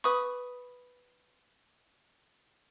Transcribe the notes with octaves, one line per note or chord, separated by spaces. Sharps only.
B4 B5 C#6 D#6